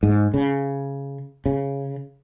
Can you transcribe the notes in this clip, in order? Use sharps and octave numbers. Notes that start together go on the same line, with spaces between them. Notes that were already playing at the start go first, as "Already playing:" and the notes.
G#2
C#3
C#3